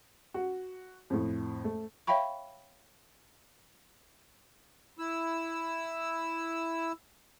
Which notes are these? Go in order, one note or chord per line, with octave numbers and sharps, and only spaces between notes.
F#4
F2 A2
A3
C#5 E5 F5 G5 B5 C#6
E4 E6